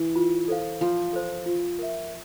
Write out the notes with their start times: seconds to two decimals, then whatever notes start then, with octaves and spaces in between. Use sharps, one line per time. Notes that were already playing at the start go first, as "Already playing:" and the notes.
Already playing: E3
0.16 F4
0.48 A4 C5 F5
0.81 F3 F4
1.13 A4 C5
1.46 F4
1.79 A#4 E5